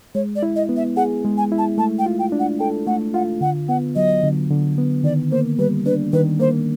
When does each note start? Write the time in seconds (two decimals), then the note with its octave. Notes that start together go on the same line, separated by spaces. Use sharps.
0.15 G#3 C#5
0.36 D5
0.43 E4
0.56 D#5
0.69 B3
0.77 E5
0.97 G#4 F#5
1.25 G#3
1.38 G#5
1.52 E4
1.58 A5
1.78 A3 A5
1.99 G5
2.06 F4
2.19 G5
2.32 D4
2.39 F#5
2.60 A4 G5
2.87 A3 F#5
3.14 F4 F#5
3.41 D3 F#5
3.69 B3 F#5
3.96 F#3 D#5
4.23 D3
4.51 D3
4.78 B3
5.04 D#3 D5
5.31 A#3 C5
5.59 G3 B4
5.86 D4 B4
6.13 D#3 B4
6.40 A#3 C5